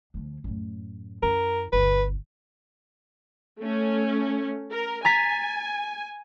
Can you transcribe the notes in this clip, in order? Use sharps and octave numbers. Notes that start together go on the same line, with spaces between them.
D2 F3
F#2 A2
F#2 E4 A#4
G1 D2 B4
A3 C#4
A#4
G#5 A#5 A6 B6